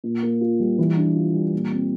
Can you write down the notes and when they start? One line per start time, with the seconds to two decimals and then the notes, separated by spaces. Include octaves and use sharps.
0.04 A#2
0.22 A#3
0.41 F4
0.59 G3
0.78 E3
0.97 D4
1.16 F4
1.34 G3
1.53 A#2
1.72 C4